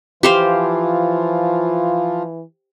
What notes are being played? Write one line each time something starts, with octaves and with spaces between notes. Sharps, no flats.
E3 F3 F4 G4 C5 F5